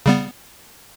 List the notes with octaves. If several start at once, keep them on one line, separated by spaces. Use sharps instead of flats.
C#3 G3 B3